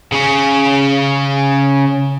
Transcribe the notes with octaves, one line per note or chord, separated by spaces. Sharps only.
C#3 C#4